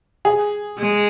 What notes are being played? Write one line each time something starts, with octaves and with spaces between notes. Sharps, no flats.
G#4
G#3